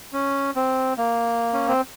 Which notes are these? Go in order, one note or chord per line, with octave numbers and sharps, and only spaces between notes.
C#4
C4
A#3
C#4
C4